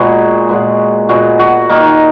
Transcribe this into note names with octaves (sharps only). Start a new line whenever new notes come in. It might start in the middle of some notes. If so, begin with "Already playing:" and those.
Already playing: A#2 G#3 B3 F#4 G#4
A#2 G#3 B3
A#2 G#3 B3 F#4
F#4
D#3 A#3 D#4